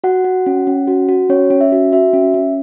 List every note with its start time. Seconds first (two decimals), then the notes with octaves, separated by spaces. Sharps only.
0.04 F#4 F#5
0.24 F#4
0.46 C#4
0.67 C#4
0.88 F#4
1.09 F#4
1.29 C#4 C#5
1.50 C#4
1.61 E5
1.72 F#4
1.92 F#4 E5
2.13 C#4
2.34 C#4